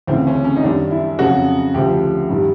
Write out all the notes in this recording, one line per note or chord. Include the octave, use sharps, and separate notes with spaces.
D2 C#3 E3 C4
C#4
C#4
D#4
F#2 D#3 G3 D4
E4
F2 C#3 F#3 F#4
D2 C#3 F3 G4
G2 D#3 G3